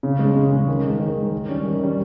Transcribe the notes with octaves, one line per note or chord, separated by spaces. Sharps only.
C#3
G#3 C#4
C#3
G#3 C#4
D#3
G#3 D#4
D#3
G#3 D#4
D#3
G3 C#4
D#3
G3 C#4